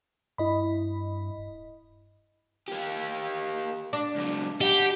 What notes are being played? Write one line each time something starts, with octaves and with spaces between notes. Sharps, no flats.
G2 E4 D#5 B5
D1
A#3 G4
D4
C#2 F#3
G4 D#5 F#5